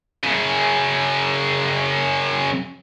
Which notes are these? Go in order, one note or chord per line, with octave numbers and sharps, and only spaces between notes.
F#2 C#3